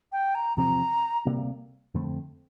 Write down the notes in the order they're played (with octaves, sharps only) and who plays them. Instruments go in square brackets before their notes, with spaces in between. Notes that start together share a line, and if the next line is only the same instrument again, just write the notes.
[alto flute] G5
A#5
[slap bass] E2 C3 F3 C4 [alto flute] A#5
[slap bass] D2 C3 G3 A#3
F2 D3 A3 C4